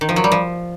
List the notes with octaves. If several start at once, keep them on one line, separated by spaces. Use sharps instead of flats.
D#3
F3
F#3
G3
F3